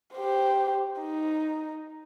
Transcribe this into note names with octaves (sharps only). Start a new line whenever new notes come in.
G4 C5
D#4